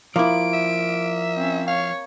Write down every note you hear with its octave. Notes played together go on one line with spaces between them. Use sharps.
F3 A#3 E4 D7
E5
C4 C#4
C#5 F5